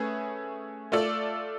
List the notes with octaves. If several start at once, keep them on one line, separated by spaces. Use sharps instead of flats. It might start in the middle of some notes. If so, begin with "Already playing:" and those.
Already playing: A3 C#4 G#4 B4
A3 F4 A4 D5